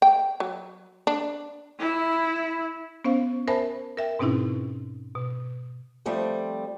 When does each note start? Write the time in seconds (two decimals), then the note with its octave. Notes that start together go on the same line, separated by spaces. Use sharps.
0.02 G5
0.40 F#3
1.07 D4
1.79 E4
3.04 B3 C#4 C5 F5
3.48 A#4 C5 E5 G#5 A5 B5
3.97 A#4 E5 G5
4.19 G#2 B2 C4 C#4 D#4 E4
5.15 B2
6.06 F3 G3 A3 C4